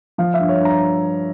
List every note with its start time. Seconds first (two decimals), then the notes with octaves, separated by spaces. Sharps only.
0.18 F3 F5
0.34 E5
0.39 G2
0.49 C#5
0.60 G2
0.65 A#5